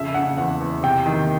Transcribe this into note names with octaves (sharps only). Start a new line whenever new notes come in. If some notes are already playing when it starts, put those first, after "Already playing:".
Already playing: F2 C#3 E5
C#3 F#5
E2 F#5
E2
C3 G5
D#3